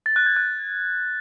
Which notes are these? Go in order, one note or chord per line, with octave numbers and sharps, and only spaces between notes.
A6
F#6
G#6
F#6